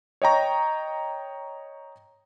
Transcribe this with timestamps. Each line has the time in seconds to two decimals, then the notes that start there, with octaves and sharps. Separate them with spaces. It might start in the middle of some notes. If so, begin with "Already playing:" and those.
0.22 C#5 D#5 G5 A#5 C#6